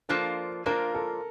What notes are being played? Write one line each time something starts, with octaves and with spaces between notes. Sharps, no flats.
F3 A#3 D4 F4 A4 C5
F3 A#3 D4 F4 A#4 C5
A4